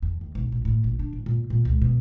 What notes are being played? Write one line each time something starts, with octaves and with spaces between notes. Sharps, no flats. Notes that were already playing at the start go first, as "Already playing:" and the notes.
F2
D#2
B1
A#1
A2
A#1
D4
A1
A#2
A#2
C#2
B2